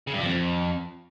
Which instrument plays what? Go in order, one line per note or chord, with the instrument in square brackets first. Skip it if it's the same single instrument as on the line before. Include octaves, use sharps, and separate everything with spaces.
[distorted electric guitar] C#3
G2
F3
F2